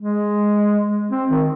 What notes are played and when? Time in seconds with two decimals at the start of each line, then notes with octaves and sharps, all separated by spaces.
0.01 G#3
1.11 C4
1.30 D#3